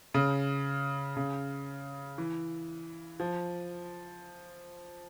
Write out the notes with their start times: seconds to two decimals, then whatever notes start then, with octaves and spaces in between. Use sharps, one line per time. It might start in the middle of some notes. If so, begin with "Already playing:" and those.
0.14 C#3
1.17 C#3
2.18 E3
3.20 F3